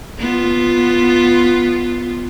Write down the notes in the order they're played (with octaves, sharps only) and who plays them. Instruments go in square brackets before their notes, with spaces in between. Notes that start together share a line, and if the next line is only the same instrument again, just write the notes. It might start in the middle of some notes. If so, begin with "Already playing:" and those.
[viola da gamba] B3 F4